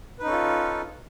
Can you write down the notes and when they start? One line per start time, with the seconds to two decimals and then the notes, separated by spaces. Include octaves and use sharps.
0.19 B4
0.22 D#4
0.25 C#4
0.28 A4
0.32 F4